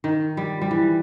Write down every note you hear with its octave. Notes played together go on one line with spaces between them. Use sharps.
D#3
G3
G3
E3